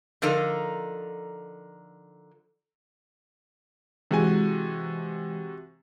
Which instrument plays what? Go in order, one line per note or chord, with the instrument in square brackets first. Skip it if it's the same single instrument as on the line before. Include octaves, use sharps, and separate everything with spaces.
[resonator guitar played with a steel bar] D3 F3 D#4 A4 A#4
[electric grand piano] C3 F#4 G#5 [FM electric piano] E3 G#3